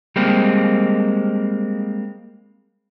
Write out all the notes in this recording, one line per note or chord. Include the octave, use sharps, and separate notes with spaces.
G3 G#3 A#3 C4